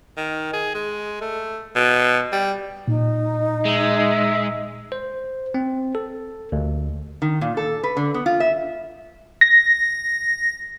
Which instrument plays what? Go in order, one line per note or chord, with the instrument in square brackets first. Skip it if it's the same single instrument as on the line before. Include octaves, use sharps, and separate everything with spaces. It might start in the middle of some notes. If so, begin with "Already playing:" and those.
[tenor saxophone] D#3
G#4
G#3
A3
B2
G3
[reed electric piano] A#2 [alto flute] D#4
[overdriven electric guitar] G#3 [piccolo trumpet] E5
[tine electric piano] C5
C4
A4
D2
[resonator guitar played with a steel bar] D#3
A#2
A4
B4
D3
B3
F4
E5
[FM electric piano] A#6